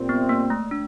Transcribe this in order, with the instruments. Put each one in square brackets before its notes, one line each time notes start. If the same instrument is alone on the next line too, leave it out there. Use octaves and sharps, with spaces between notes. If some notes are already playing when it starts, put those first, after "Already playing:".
Already playing: [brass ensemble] A#2 G3 C4
[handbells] B3
A#3
A3
D4